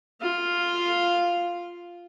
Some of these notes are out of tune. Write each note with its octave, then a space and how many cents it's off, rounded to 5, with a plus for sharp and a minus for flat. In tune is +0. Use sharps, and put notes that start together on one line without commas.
F4 +0 F5 +0